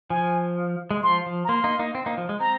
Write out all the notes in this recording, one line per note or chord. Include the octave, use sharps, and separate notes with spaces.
F3 G#5
G#3
F3 C6
F3
A#5
A#3 C6
A#3 D#4
A#3 D#4
C4
A#3 D#4
F3
G#3
C4 A#5